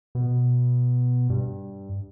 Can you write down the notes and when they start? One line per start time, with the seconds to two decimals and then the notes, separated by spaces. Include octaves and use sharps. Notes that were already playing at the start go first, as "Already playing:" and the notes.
0.15 B2
1.30 G2